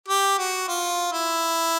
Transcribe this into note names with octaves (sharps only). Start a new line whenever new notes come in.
G4
F#4
F4
E4